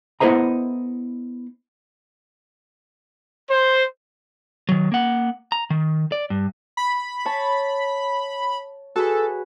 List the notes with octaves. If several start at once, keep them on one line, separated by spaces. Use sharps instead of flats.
B3 E4 A4 C5 D#5 A#5
C5
D#3 F#3
A#3 F#5
A#5
D#3
D5
G2
B5
C#5 A5
F#4 G#4 A4 B4